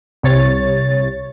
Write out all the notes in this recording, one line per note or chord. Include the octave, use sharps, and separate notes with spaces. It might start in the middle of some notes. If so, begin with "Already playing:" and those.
C2 C3 C#5 A6